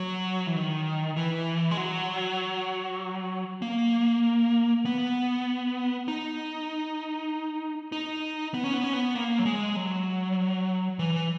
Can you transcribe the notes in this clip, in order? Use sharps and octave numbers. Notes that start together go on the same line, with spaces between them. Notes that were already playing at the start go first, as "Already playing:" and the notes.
Already playing: F#3
E3
D#3
E3
G#3
F#3
A#3
B3
D#4
D#4
B3
C#4
B3
C#4
B3
A#3
F#3
G#3
F#3
E3